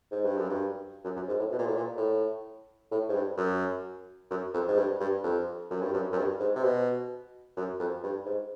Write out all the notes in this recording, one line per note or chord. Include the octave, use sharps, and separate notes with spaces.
G#2
G2
F#2
G2
F#2
F#2
G#2
A2
B2
A#2
A2
A#2
A2
A2
G#2
G2
F#2
F#2
F2
G#2
G2
G2
F2
F#2
G2
F#2
F#2
G2
G#2
C3
B2
F#2
F2
G2
G#2